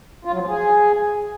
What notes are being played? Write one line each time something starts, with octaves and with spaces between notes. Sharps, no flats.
F4
F#3
F3
G#4